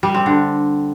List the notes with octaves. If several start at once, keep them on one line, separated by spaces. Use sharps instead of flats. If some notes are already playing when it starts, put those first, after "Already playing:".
G3
C4
D3